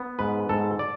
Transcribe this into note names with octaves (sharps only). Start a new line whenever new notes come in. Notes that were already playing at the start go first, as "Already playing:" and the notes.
Already playing: B3
G#2 B4
G#2 A4
D5